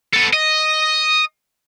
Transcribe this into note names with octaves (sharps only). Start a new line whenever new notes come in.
B3 A4
D#5